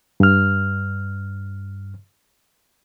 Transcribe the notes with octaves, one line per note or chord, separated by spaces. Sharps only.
G2 F6